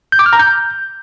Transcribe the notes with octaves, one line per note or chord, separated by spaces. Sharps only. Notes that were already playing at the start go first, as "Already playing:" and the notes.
G6
D6
F6
A#5
G6